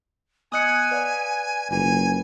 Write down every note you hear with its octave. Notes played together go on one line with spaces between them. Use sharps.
B3 D#5 G#5 D#6 F#6 G#6 C#7
B4 D5 F5
F#1 C#4 F4 B4 G#5